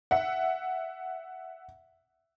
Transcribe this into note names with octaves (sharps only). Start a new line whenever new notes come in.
E5 F#5